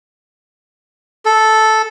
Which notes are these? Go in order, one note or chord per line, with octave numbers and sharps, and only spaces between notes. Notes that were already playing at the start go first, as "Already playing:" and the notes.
A4